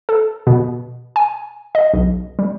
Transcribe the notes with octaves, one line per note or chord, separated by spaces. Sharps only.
A4
B2
G#5
D#5
B1
G3